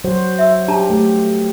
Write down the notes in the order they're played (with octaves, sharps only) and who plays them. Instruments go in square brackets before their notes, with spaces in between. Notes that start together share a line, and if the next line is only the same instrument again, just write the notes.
[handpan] F#3 F#4 C5
[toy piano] E5 E6
[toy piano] D4 A5 A#5 [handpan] G4
[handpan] A3 G4